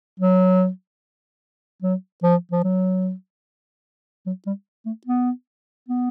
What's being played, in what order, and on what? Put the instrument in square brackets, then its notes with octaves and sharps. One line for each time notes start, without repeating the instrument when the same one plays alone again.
[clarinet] F#3
F#3
F3
F3
F#3
F#3
G3
A3
B3
B3